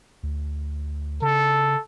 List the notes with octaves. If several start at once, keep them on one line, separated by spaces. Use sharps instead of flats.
D2
C#3 A4